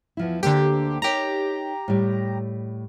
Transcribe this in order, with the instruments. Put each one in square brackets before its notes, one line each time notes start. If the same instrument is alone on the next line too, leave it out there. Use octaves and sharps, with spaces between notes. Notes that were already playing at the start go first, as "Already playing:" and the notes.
[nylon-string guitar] E2 F3 E4
[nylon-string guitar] D2 A#3 C5 [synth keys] D3 G4
[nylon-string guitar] D#4 A#4 C#5 [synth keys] G4 A#5
[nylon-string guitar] A2 G3